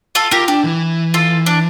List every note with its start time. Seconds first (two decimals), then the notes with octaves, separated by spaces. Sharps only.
0.15 F4 A4
0.31 F4 G4 A#4
0.48 D4 G4
0.64 E3
1.14 F4 A4
1.46 D4